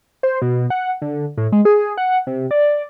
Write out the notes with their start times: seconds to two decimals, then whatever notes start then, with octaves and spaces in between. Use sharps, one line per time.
0.23 C5
0.42 B2
0.70 F#5
1.02 D3
1.37 A2
1.52 G#3
1.65 G#4
1.97 F#5
2.27 C3
2.51 D5